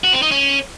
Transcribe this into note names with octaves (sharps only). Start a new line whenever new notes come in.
F#4
C4
D#4
C#4